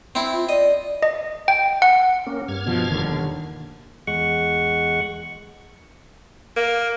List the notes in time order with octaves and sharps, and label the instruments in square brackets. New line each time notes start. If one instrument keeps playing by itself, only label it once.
[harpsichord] C4 E4
[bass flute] F4
[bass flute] D5 [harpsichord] D#5
[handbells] D#5
G5
F#5
[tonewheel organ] A#3 C#4
G2 F6 G#6
[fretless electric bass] B2 F3
E1 D#2 D3
[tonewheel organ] E2 G#3 F#5 C#6
[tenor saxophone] A#3